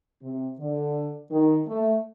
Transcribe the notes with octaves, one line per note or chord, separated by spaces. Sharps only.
C3
D3
D#3
A3